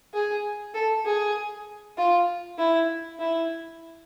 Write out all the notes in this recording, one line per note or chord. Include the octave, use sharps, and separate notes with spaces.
G#4
A4
G#4
F4
E4
E4